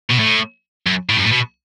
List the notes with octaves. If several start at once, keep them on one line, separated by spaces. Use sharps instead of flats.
B2
A2
F#2
A2
F#2
A2
B2